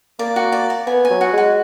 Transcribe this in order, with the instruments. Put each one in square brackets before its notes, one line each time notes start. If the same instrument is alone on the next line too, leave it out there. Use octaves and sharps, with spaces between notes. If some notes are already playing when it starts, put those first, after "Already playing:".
[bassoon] A#3 [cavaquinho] D5
[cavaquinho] F#4
D5
D5
[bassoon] B3 [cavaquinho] G#5
[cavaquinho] G#5
[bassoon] F#3
[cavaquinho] F#4
[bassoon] G#3 [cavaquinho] F#4